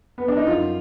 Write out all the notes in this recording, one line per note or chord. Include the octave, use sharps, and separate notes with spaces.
B3
D4
D#4
F#2 F4